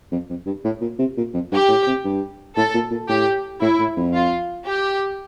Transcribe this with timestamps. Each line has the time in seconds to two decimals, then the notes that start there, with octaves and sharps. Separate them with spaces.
0.12 F2
0.29 F2
0.46 G2
0.65 A2
0.81 A#2
0.99 C3
1.17 A#2
1.34 F2
1.51 G2 G4
1.69 A2
1.87 C3
2.04 G2
2.57 A2 A4
2.74 A#2
2.91 A#2
3.09 A2 G4
3.61 A2 E4
3.79 A2
3.97 F2
4.14 F4
4.66 G4